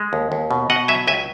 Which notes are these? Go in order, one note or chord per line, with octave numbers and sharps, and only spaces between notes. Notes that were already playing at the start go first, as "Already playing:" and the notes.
Already playing: G#3
D#2
D#2
B2
B2 D#5 F#5
F#3 E5 G#5
C#2 E5 G#5